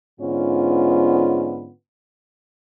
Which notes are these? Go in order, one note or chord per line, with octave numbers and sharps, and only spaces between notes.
G#2 D3 B3 C#4 F4